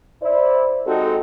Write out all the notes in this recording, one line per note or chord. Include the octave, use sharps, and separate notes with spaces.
E4 C5 D5
G#3 C4 D#4 F#4 G4 A4